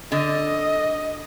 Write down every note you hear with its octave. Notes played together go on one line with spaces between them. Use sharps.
D3 D#5